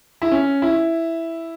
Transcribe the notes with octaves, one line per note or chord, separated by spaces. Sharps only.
E4
C#4
E4